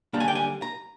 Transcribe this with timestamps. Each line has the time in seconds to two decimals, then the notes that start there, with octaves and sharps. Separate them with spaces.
0.13 D3 G3 A#3 D4 A#5
0.20 G#5
0.28 G5
0.35 G#5
0.62 A#5